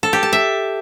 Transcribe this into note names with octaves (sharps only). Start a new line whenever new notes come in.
A4
G4
A5
E5